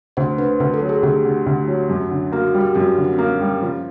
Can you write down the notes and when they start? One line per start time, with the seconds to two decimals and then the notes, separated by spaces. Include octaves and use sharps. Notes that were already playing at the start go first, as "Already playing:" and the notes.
0.17 D2 C5
0.38 D3 B4
0.60 D2 A#4
0.74 A4
0.81 F#3
0.89 G#4
1.03 D2 G4
1.25 D3
1.46 D2
1.68 F#3
1.89 F#2
2.11 D3
2.32 A#3 F#4
2.47 F#4
2.54 G3
2.61 G4
2.75 F#2 F#4
2.89 F#4
2.97 D3
3.04 C#4
3.13 C4
3.18 A#3 C#4
3.41 G3
3.62 F3